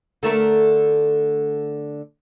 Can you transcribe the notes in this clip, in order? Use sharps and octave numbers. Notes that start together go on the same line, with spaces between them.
D3 A3 A#4